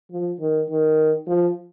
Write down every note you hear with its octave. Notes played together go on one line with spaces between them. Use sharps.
F3
D#3
D#3
F3